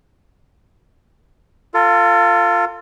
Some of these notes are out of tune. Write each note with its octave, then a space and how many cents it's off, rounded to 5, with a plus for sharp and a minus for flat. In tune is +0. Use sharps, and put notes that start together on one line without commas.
F4 +0 A4 +35